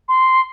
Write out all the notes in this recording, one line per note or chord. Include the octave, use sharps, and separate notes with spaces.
C6